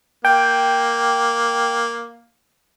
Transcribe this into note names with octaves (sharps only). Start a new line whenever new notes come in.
A#3 G5